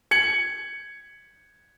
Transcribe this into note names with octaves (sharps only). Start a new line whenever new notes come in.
G#6 C#7 F#7